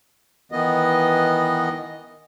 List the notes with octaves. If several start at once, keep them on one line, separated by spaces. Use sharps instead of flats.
D#3 E3 B3 D#5